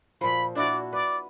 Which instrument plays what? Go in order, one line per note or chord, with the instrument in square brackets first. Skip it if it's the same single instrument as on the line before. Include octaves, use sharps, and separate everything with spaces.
[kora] A#2 F3 [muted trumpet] B5
[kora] D4 E4 F#4 [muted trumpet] D5
[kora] B4 [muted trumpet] D5